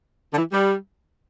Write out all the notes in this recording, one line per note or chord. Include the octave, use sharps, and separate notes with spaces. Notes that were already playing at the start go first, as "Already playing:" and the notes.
D3
E3
G3